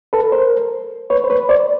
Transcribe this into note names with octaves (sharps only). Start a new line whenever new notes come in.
A4 B4
A#4 C5
B4 C#5
C5
B4 C#5
C5 D5